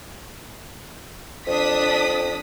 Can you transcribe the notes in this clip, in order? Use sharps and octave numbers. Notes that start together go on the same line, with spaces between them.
F2 D4 D#6 B6